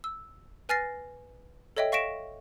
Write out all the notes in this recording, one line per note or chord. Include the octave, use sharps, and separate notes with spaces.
E6
B4 G#5 F6 A6 A#6 C7
A4 C#5 D#5 E5 G5
F5 C#6 A#6 B6 D7 E7